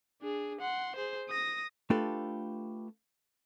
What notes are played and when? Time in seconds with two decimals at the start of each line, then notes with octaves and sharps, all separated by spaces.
0.22 D4 G#4
0.61 F#5 C6
0.96 G#4 C5
1.29 D#6 A#6
1.90 A3 D4 F4 G4 A4 B4